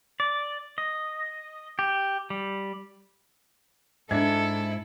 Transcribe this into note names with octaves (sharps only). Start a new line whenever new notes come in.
D5
D#5
G4
G3
G#2 D4 E4 A4 G#6